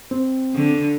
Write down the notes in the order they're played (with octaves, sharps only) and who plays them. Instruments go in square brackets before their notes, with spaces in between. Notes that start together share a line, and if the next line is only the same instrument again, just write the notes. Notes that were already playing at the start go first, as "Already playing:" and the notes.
[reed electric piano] C4
[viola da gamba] D3